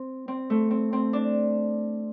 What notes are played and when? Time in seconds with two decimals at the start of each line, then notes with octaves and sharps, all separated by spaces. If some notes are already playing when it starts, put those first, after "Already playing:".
Already playing: C4
0.28 C4
0.50 A3
0.71 C4
0.93 C4
1.13 D4